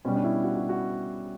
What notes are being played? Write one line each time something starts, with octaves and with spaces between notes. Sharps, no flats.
B2 G3 C#4
D4
E4
F#4
F#4
F#4